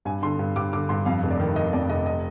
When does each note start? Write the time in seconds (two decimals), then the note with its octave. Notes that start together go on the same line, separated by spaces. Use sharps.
0.05 G2 G#5
0.22 D3 C6
0.39 G2
0.56 G2 D6
0.73 D3 D6
0.89 G2 C6
1.06 F2 F5
1.23 F1
1.31 D5
1.40 D#3
1.55 D#3 D#5
1.73 F2 D5
1.90 F1 D#5
2.06 D#5